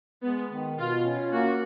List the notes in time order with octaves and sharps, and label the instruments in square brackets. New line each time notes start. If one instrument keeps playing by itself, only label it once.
[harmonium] G#3 [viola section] B3
[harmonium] D#3
[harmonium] B2 [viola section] F4
[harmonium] C#4
[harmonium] A#3 [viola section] F#4